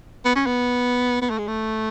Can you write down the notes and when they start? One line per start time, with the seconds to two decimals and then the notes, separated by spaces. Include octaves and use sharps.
0.25 B3
0.35 C#4
0.46 B3
1.22 B3
1.30 A3
1.38 G#3
1.47 A3